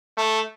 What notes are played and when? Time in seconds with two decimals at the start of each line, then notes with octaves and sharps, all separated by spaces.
0.17 A3